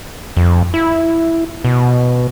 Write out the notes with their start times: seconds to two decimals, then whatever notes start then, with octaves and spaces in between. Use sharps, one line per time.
0.37 F2
0.74 E4
1.65 B2